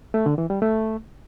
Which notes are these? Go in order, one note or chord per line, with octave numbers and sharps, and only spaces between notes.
A3
D3
E3
G3
A3